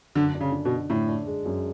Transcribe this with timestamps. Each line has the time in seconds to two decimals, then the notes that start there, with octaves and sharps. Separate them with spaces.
0.15 F#2 D3
0.35 D4
0.40 C#3
0.52 D3
0.65 B2
0.71 D3
0.90 A2 D3
1.08 D4
1.27 G#3
1.45 F#2